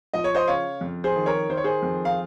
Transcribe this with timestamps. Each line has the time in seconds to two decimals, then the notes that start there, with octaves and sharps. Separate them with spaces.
0.14 F3 D#5
0.24 C#5
0.35 C5 D#5
0.47 C#3 C#5 F5
0.81 F2
1.04 G#4 C5
1.16 D#3
1.26 A#4 C#5
1.50 D#3 C5
1.57 C#5
1.64 G#4 C5
1.83 F2
2.05 F5